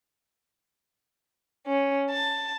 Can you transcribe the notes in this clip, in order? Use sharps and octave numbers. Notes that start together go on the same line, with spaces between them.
C#4
A5